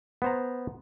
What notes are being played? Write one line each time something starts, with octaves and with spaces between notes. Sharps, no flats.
B3 C5 A#5